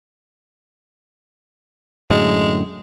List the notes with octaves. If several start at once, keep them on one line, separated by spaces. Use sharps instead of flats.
F#2 A2 D3 G#3